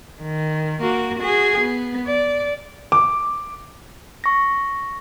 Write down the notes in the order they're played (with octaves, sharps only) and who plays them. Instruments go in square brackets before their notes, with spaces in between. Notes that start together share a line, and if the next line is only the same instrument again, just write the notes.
[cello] D#3
A#3 F#4
F#4 G#4
B3
D5
[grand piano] D6
[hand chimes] C#6 A#6